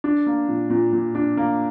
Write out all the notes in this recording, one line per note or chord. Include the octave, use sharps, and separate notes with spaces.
D4
A#3
A#2
A#2
A#2
D4
A#3